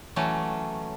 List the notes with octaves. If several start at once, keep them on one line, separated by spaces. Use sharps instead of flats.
E3 F#3 A3 C#4